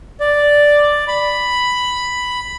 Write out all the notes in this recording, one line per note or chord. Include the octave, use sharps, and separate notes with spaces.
D5
B5